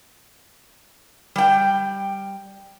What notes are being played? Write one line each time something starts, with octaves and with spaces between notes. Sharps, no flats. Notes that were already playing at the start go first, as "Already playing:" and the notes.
G3 G5